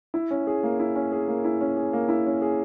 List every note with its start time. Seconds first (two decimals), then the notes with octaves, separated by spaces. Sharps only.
0.14 E4
0.31 C#4
0.47 G#4
0.63 A#3
0.80 E4
0.95 C#4
1.12 G#4
1.28 A#3
1.45 E4
1.61 C#4
1.77 G#4
1.93 A#3
2.09 E4
2.26 C#4
2.42 G#4